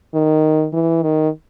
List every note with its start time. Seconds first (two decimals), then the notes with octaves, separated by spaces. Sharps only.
0.14 D#3
0.73 E3
1.02 D#3